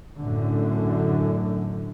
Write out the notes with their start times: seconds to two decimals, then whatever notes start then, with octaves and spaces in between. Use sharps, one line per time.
0.17 F#2 A2 D3